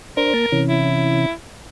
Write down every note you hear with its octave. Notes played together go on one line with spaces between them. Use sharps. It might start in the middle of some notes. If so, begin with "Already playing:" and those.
D4 A#4 C5
A#3 A5
C3 E3 C#4
E4